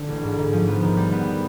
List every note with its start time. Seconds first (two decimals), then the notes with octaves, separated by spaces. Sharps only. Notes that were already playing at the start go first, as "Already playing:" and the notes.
Already playing: D3
0.08 A1
0.23 G#2
0.39 G#2
0.53 F3
0.68 B3
0.83 D#3
0.97 G3
1.12 B3